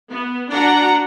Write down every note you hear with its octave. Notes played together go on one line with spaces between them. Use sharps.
B3
D4 F#4 F#5 A#5